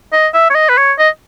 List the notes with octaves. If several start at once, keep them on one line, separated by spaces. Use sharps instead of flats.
D#5
E5
C#5
D#5
B4
C#5
D#5